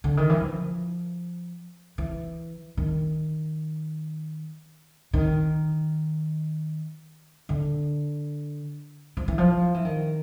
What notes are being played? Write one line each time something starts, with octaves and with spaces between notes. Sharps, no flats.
D3
D#3
E3
F3
E3
D#3
D#3
D3
F3
E3
F3
E3
D#3